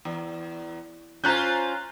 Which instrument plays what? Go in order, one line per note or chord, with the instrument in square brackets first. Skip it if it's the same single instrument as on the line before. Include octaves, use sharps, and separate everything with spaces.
[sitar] E2
[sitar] C#4 F4 C5 [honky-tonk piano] A#5 F#6 G6